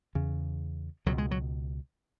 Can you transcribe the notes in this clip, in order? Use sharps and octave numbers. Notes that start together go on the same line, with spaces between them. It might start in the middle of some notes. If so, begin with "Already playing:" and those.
E2 C#3
C#2 B2 F#3
G#3
F#3